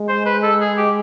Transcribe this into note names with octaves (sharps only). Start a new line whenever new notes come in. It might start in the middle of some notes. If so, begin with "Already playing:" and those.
Already playing: G#3
C5
B4
A4
G#4
G4